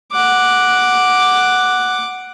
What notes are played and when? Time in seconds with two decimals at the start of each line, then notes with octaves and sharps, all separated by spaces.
0.12 F#5 D6